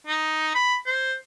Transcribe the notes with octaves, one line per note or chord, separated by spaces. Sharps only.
D#4
B5
C5